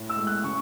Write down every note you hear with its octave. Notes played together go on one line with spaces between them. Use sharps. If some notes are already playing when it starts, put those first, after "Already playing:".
Already playing: A2
E6
G#3
F#6
C#3 C#6